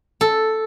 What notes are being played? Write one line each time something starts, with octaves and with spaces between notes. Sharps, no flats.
A4